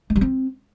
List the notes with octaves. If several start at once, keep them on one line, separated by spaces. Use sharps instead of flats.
G#3
G3
C4